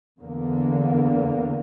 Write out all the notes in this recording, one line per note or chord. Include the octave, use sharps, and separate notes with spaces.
E2 D3 A#3